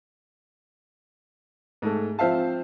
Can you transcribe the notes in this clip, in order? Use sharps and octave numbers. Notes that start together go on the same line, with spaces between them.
G#2 A3
F3 C4 C5 E5 F5 A5